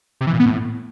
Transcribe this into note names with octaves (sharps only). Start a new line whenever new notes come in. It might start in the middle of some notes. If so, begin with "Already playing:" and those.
C3
E3
A#2
B3
A2